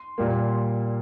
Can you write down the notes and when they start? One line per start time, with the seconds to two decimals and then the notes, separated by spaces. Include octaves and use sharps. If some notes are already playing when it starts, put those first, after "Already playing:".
Already playing: C6
0.18 A#2 G3 A#3